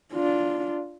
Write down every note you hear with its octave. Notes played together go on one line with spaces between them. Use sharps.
D4 F4